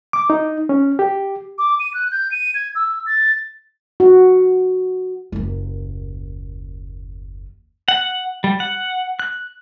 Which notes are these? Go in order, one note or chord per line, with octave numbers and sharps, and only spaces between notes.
D6
D#4
C#4
G4
D6
D#7
F#6
G6
D#7
G#6
E6
A6
F#4
F#1 D#2
F#5
G3
F#5
F#6